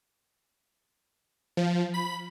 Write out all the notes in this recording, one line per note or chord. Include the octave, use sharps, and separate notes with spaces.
F3
B5